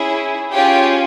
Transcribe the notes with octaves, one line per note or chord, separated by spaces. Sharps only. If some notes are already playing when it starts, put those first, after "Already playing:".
Already playing: C#4 E4 G#4
C#4 F4 G4 G#4 G5